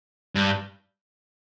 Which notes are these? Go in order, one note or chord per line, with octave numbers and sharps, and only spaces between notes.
G2